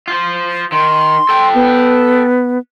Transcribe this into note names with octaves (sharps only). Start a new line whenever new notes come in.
F4 C5
D#3 C6
A4 G5
B3